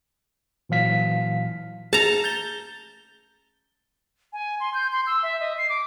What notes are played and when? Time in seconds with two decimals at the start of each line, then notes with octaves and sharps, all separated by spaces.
0.69 A#2 E3 F#3 F5 B6
1.93 G#4 A5 A#5
2.24 G6 A6 G7
4.33 G#5
4.60 C6
4.74 G6
4.92 C6
5.07 E6
5.23 E5
5.40 D#5
5.58 C7
5.69 D6